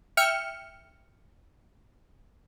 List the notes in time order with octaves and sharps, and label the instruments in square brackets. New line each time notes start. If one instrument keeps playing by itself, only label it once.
[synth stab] E5 G5 F6 C#7